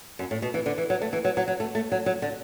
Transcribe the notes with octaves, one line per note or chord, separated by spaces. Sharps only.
F#2
A2
B2
E3
D3
E3
F#3
A3
E3
F#3
F#3
F#3
A3
A3
F#3
F#3
D3